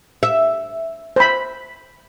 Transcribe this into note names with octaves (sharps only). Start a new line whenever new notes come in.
E5
C5 B5